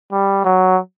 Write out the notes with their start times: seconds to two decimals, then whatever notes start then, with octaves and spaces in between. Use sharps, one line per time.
0.12 G3
0.45 F#3